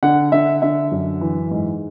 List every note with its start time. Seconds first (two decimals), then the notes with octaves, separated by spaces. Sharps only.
0.03 D3 F#5
0.32 D3 E5
0.62 D3 E5
0.92 F#2
1.21 E3
1.51 G#2